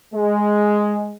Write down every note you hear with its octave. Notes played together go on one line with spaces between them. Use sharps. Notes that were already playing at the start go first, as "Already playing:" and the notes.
G#3